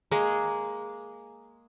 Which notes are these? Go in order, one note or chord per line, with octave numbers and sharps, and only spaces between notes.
G#3 A#3 G#4